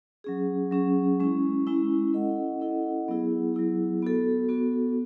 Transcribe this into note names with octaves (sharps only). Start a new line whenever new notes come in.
F#3 C#4 G#4
F#3 C#4 G#4
G#3 C#4 E4
G#3 C#4 E4
C#4 E4 A4 D#5 F#5
C#4 E4 A4 D#5 F#5
F#3 B3 E4 G#4
F#3 B3 E4 G#4
B3 F#4 A4
B3 F#4 A4